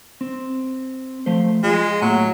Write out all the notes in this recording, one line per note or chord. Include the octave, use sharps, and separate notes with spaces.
C4
F3 A3 C5
G#3 F4
A2 F#3 A#3